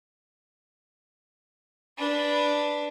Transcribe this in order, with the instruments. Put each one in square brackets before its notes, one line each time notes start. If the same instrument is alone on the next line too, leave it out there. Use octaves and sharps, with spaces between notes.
[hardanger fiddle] D4 B4